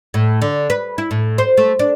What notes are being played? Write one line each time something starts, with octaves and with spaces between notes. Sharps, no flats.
A2
D3
B4
E4
A2
C5
A3
D4